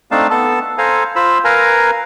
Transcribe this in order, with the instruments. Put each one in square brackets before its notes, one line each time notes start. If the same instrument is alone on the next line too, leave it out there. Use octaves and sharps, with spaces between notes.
[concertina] A3 C4 D4 D#4 F5 A5
B3 A4 A5
A4 C5 F5 G#5 A#5
F4 C5 B5 E6
A#4 B4 F5 G#5 A#5